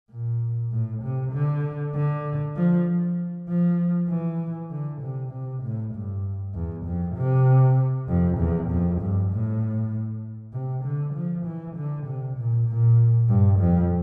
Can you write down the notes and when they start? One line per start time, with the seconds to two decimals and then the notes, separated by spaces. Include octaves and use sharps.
0.11 A#2
0.72 A2
1.02 C3
1.33 D3
1.94 D3
2.56 F3
3.49 F3
4.09 E3
4.71 D3
5.01 C3
5.32 C3
5.63 A2
5.94 G2
6.54 E2
6.85 F2
7.16 C3
8.08 F2
8.38 E2
8.70 F2
9.00 G2
9.31 A2
10.53 C3
10.84 D3
11.14 F3
11.46 E3
11.76 D3
12.06 C3
12.37 A#2
12.68 A#2
13.29 G2
13.60 F2